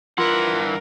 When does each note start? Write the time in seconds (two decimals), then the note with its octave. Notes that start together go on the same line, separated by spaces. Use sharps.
0.18 G2 E3 F4 A#4 F#5 C6